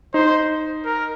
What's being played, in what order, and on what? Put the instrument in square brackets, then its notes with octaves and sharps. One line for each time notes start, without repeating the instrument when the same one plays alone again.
[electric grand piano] D#4 [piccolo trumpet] C5
[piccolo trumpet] A#4